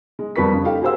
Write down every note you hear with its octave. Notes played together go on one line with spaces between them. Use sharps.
G#3
F2 G3 A#4 B4 C#6 B6
F2 C#3
D#4 F4 G4 A4 F5 G5
F#4 G#4 A#4 C5 F5 E6